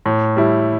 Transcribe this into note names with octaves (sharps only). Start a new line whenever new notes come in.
A2
G3 E4